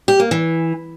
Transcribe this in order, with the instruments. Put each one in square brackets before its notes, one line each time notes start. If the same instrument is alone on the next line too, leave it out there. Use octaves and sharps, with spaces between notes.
[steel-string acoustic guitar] G4
A#3
E3